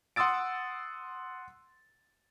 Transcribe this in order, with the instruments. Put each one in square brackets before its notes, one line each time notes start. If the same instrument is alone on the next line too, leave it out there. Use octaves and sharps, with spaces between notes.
[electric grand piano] F#5 C6 D#6 E6 A6 D7